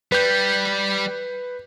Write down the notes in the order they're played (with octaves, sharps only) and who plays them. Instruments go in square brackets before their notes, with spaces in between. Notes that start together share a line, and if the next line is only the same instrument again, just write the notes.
[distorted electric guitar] G3 [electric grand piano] B4 G6